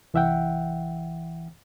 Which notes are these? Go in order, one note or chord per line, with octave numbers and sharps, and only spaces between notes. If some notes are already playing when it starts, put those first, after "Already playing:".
C2 E3 E5 F#5 G5